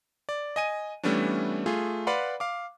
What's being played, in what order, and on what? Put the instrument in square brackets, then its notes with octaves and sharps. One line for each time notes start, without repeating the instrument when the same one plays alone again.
[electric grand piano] D5
D#5 G#5 D#7
E3 G3 A3 B3 C#4 D4
A3 F4 G#4
B4 D5 F5 F#5 B5 C6
F5 D6